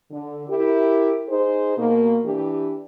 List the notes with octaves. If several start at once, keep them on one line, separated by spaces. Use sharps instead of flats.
D3
E4 G4 A#4
D#4 G#4 C5
B2 A#3
E3 D4 G4